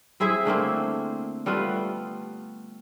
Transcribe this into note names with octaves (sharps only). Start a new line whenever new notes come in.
C4 E4 G#4 E5
D3 A3 A#3 C4
G3 A3 B3 F4